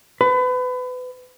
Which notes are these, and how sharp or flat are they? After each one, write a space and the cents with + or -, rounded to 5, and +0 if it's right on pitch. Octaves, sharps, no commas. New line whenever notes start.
B4 +30